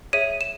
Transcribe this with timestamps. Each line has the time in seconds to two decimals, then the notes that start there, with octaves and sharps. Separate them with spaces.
0.13 G#4 C#5 E5 D#7
0.41 E7